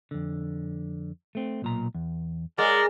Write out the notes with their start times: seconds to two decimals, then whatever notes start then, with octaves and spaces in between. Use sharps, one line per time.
0.11 F2 D3
1.35 A3 C4
1.62 B1 A#2 A#5
1.95 E2
2.58 G#3 A#4 C#5 D5 F#5 A#5